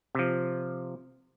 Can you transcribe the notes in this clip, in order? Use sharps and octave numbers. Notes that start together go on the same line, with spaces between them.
C3 F3